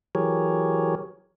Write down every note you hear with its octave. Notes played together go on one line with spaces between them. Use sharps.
E3 F#3 G4 G#4 A#4 C#5